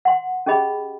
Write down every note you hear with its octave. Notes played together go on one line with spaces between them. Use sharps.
F#5 C6
C#4 G4 G#4 D#5 B5